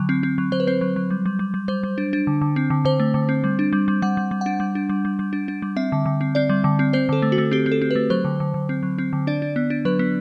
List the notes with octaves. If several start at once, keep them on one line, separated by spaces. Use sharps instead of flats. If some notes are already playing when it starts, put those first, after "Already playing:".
Already playing: D3 F#3
C4
C4
F#3
F#3 C5
B4
C4 C5
F#3
F#3
G3
G3
G3
G3
G3 C5
G3
D4
D4
D3
D3
C4
D3
D3 C5
A3
D3
C4
G3
D4
G3
G3
G3 F#5
G3
G3
D4 F#5
G3
D4
G3
G3
G3
D4
D4
G3
C4 E5
D3
D3
C4
C4 D5
G3
D3
C4
C4 C5
D3 A4
A3
F#4
A3
C4 G4
C4
A4
C4
A3 B4
F#3 C5
D3
D3
D3
C4
F#3
C4
D3
D4 D5
D4
B3
D4
F#3 B4
B3